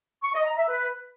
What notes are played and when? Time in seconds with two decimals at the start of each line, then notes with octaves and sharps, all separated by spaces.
0.24 C#6
0.35 D#5
0.46 A#5
0.57 E5
0.68 B4